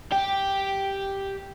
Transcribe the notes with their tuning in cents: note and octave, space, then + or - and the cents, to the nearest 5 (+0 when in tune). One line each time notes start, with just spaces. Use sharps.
G4 +0 G5 +0